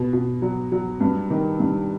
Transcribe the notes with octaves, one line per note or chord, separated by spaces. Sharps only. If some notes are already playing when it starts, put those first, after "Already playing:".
Already playing: B2
B2
F#3
F#3
G2
D#3
G2